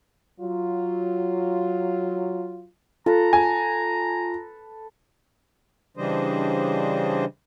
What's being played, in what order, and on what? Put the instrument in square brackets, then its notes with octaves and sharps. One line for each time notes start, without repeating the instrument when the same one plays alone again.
[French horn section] F#3 F4
[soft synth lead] F4 [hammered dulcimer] A4 B4 [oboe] A#5
[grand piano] G#5
[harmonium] C#3 E3 G3 D4 C5 D#5